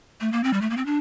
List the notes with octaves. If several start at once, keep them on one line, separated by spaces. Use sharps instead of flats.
A3
A#3
C4
G3
A3
A#3
C4
D4